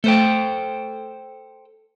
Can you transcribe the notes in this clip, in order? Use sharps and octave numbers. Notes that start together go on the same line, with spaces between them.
A3 A4 C5 G5